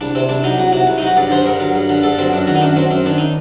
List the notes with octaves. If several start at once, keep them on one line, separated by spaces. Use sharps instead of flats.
C2 D4
C3 C4
C2 D4
F#3 D#4
C2 F#4
C3 F#4
C2
D#4
F#3 F#4
G2 D5
D3 C5
G2 A#4
F#3
G2
D3
G2 A4
F#3 C4
F#2 D4
D#3 F#4
D#4
F#2 D4
F#3 C4
F#2 C4
D#3 D4
D#4